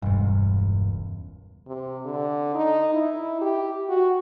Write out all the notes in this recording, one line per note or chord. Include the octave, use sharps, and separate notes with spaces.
E1 C#2 G2
C3
D3
D#4
E4
G4
F#4